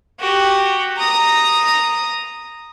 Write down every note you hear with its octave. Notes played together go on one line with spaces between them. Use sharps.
F#4 G4
A#5 D#6